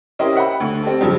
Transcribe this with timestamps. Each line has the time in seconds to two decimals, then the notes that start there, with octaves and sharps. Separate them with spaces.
0.19 C#4 E4 G4 A#4 C5 D#5
0.35 E5 F#5 G5 B5
0.60 D2
0.83 C4 G4 A4
1.01 E2 G2 C#3 F3 F#3